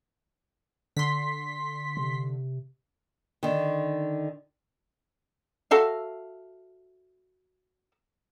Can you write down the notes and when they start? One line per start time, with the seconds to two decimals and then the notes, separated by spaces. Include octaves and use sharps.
0.97 D3 C6 B6
1.97 C3
3.43 D3 D#3
5.71 F#4 A4 E5 F5